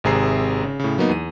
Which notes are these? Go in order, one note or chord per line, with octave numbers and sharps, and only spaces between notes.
G#1 C3 G#4 A#5 C7
C#3
A2 C#3
F#3 A#3 B3 D#4
E2 D#7